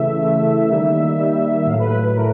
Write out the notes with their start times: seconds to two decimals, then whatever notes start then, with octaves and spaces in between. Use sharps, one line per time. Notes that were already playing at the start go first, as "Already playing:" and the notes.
Already playing: C#3 E3 A3 E5
0.20 C#3 E3 A3
0.69 D#3 G3 A#3
1.18 D#3 G3 A#3
1.66 A2 F#3 A3 F5
1.79 B4
1.91 B4
2.03 B4
2.16 A2 F#3 A3 A#4